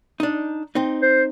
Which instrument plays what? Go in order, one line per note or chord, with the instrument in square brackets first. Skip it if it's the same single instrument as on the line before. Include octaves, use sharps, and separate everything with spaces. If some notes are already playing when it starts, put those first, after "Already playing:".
[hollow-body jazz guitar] D4 D#4
C4 D#4
[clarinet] C5